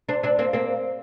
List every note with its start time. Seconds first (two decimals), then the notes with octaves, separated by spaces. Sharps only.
0.09 C4 D4
0.23 C4 D4
0.39 A#3 C4
0.53 A#3 C4